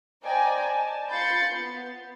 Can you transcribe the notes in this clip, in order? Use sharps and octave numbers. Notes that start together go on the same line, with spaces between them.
C5 D5 D#5 G5 G#5 A#5
A5
F4 B5 G6 A6 C7 C#7
B3